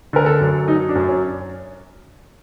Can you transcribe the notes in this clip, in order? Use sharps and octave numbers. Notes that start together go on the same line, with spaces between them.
D3 A#4
A4
F#2
F#3 D#4
D4
F#2
C#4